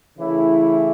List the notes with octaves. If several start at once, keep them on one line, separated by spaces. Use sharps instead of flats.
C#3 E3 A3 E4